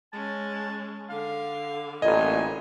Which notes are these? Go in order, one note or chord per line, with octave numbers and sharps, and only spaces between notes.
G#3 C#4 A5
D3 F5
A1 A#2 D#5 G#5